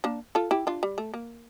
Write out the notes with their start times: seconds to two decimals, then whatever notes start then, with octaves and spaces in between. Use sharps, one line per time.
0.04 A#3 D4
0.35 F4 A4
0.51 E4 G4
0.67 D4 F4
0.83 G3
0.98 A3
1.14 A#3